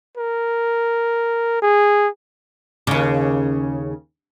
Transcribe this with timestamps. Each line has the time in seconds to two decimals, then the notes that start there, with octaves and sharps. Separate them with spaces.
0.17 A#4
1.62 G#4
2.87 D#2 C#3